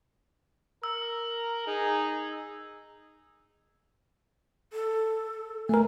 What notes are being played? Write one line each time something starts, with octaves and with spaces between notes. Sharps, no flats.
A#4 E6
D#4 G#4
A4
A3 A#4 G#5